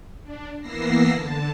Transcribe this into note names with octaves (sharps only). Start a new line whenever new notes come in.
D4
E3 A#3 B3 E6 A#6 C7
D3 A5